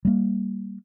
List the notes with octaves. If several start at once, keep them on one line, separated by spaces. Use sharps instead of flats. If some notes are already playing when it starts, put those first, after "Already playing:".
G3 A#3